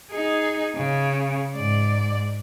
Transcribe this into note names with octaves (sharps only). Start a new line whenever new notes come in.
D#4 G#4
C#3
G#2 D5